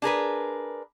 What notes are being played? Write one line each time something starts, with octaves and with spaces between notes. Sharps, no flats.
D4 G#4 A#4 B4